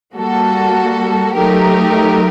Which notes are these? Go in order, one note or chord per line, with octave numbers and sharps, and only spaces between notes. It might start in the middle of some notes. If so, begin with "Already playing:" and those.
G3 A#3 F#4 A4
F#3 A3 D#4 G4 A#4